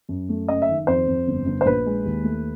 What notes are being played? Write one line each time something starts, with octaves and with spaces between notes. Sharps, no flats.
F#2
A3
F#1 D#5
E5
D#3
F2 C5
F2
G1
G1
C5
A#1 B4
G#3
D#2
A3